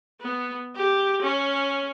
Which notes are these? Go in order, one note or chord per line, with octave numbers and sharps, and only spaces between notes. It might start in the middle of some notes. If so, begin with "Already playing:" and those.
B3
G4
C#4